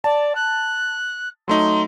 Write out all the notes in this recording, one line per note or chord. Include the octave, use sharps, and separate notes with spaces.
D5 A5
F#6
F#3 A3 D#4 C6